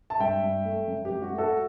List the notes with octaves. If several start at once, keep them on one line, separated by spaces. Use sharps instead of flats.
A5
G2 E5 G5
G2
A3
F#2
G4
F#2
F#4
A3
F#4 A4